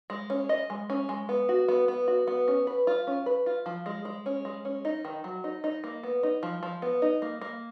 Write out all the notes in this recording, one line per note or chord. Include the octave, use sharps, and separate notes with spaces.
G#3
C#4
D#5
G#3
C#4
G#3
B3
F#4
B3
B3
F#4
B3
C#4
B4
F4
C#4
B4
F4
F3
G#3
G#3
C#4
G#3
C#4
D#4
D#3
F#3
D#4
D#4
A#3
B3
D#4
F3
F3
B3
D#4
A#3
A#3